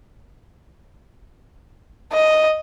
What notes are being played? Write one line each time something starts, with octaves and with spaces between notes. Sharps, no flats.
D#5